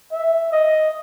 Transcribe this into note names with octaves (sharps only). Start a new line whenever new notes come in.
E5
D#5